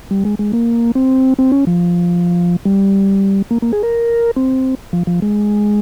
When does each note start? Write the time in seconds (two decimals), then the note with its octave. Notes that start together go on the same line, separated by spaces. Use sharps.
0.11 G3
0.25 G#3
0.39 G#3
0.53 A#3
0.95 C4
1.39 C4
1.52 C#4
1.67 F3
2.65 G3
3.51 A#3
3.62 A#3
3.73 G#4
3.83 A#4
4.36 C4
4.93 F3
5.07 F3
5.22 G#3